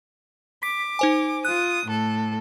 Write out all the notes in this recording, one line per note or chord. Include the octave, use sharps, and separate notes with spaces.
D6 B6
D#4 C5 G#5
F4 D#6 F#6
A2 A4